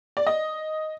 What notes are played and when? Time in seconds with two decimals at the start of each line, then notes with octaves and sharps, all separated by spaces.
0.17 D5
0.27 D#5